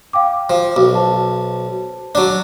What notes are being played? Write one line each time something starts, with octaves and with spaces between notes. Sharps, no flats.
F5 G5 D6
F3
B1
C5 A5
F#3 D4